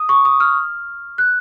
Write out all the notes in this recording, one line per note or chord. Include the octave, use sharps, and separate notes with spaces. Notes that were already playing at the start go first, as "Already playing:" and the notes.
Already playing: D#6
C#6
D#6
F6
F#6